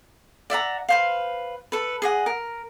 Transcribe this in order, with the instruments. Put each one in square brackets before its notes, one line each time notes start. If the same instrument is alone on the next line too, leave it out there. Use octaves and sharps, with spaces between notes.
[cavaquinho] D5 E5 F#5 A#5
B4 C5 F5
A4 B4
G#4 D#5 F#5
A#4